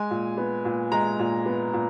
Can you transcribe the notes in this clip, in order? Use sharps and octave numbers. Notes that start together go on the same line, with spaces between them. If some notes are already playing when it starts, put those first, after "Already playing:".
Already playing: G#3 G#5
A#2
B3
A#2
G#3 A#5
A#2
B3
A#2